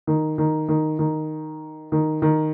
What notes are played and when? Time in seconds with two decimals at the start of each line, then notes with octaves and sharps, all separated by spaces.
0.07 D#3
0.38 D#3
0.69 D#3
0.99 D#3
1.92 D#3
2.22 D#3